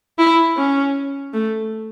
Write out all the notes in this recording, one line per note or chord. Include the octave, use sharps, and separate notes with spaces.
E4
C#4
A3